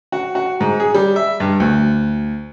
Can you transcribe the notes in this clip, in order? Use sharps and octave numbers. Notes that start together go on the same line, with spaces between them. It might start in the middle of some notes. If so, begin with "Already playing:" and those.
F#4
F#4
G#2
G#4
G3
E5
G2
D2